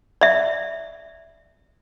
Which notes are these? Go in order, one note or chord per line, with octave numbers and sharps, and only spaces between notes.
D5 E5